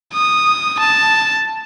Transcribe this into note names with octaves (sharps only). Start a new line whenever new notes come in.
D#6
A5